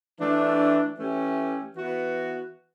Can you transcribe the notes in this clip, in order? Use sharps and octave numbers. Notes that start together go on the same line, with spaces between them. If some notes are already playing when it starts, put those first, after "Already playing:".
E3 A3 D4
E3 A3 C#4 G4
E3 B3 F#4 B4